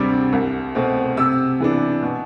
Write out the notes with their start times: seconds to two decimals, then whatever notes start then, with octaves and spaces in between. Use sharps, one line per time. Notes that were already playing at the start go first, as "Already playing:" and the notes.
Already playing: D2 C3 G3 D4
0.33 C2
0.75 B2 A3 C4
1.17 C3 E6
1.60 E3 B3 D4
2.02 B2